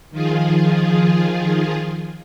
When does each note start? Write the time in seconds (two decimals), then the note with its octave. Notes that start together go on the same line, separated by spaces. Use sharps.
0.11 D#3 F3 F4 G#4